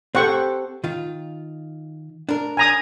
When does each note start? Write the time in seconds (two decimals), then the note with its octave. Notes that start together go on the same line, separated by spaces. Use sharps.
0.15 C4 G4 A4 C5 F#5 C#6
0.84 D#3 F4
2.29 D4 A#4
2.57 G#5 A#5 D#6